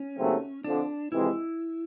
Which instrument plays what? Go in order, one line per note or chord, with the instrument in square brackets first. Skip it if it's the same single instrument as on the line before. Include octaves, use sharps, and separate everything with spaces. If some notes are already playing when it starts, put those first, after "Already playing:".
Already playing: [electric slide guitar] C#4
[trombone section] D#2 C#3 F#3 A3 C4
[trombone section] F2 D3 F3 [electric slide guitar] D4
[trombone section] F2 C3 E3 G#3 C4 [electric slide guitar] E4